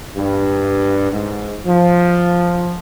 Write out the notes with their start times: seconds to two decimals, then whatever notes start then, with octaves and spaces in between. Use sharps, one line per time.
0.15 G2
1.12 G#2
1.66 F3